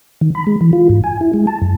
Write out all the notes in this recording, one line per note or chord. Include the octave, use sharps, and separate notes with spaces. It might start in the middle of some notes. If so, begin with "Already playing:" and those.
D#3
B5
G#3
E3
F4
G#2
G#5
E4
G#3
A5
F#2